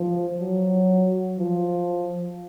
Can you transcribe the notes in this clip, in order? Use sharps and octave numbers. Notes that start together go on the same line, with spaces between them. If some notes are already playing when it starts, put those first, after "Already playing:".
Already playing: F3
F#3
F3